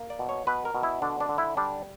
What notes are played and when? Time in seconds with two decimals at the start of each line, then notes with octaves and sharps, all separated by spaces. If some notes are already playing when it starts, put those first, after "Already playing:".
Already playing: A#3
0.10 D5
0.19 B2
0.29 C#5
0.47 B2 B4
0.65 A#4
0.74 B2
0.83 E4
1.02 D3 D4
1.20 D4
1.29 D3
1.38 E4
1.57 G3 D4